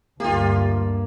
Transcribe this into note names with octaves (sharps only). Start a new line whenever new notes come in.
D2 G2 A#3 F4 G4